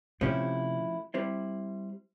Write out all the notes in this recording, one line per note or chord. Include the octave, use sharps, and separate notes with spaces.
C3 F3 A3 C#4 E4 G4
G3 C4 E4